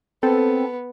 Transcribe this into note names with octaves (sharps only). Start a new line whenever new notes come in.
B3 C4 A4